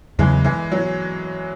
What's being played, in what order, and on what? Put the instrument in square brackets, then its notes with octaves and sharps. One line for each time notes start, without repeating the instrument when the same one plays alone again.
[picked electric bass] E2 C#3 F#3 [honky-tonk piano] E3 G#3
[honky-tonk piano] E3 G#3
F#3